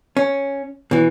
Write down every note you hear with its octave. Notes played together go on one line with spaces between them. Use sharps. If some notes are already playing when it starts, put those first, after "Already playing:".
C#4
B2 E3